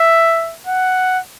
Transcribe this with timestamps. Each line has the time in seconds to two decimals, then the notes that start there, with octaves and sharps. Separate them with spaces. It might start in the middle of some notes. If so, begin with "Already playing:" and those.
Already playing: E5
0.67 F#5